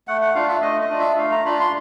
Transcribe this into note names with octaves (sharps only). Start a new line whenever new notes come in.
A3 F#5
F#5
D4 F4 F5
E5
A3 D#5
D#5
D4 F4
E5
A3 F5
A#5
D4 F4 B5
C6